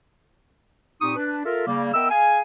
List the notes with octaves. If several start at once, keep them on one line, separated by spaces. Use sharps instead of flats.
A#2 C4 D#4 G4 C#6 D#6
D4 B4
F4 A4 A#4 E5
C#3 G3 A#3
B3 A#4 D#5 E5 G5 E6
G#4 F5 G#5